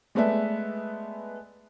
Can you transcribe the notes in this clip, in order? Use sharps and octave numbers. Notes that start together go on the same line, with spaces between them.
G#3 A3 B3 D5 E5